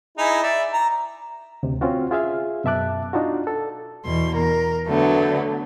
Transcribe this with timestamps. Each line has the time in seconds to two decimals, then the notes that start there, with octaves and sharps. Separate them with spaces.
0.18 D#4 E4 G#4
0.43 D5 E5
0.73 A#5
1.63 D2 C3
1.81 C4 C#4 F4 F#4
2.11 F4 G#4 E5 F5
2.64 F#2 B2 E5 A5 D6 F#6
3.13 D4 D#4 F4 F#4
3.47 A4
4.05 E2 B2 C6
4.36 A#4
4.88 D3 F#3 A3 B3